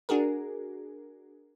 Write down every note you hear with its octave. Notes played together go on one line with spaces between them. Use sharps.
D4 F#4 G#4 A#4